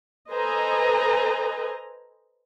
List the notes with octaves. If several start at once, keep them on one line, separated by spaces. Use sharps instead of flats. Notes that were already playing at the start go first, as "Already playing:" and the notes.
A4 B4 C5 D#5 G#5 A#5